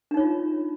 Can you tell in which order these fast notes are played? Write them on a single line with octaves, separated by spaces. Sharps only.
D4 D#4 C#5 F4